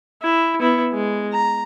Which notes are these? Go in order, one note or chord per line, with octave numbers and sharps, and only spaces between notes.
E4
B3 E4
G#3
A#5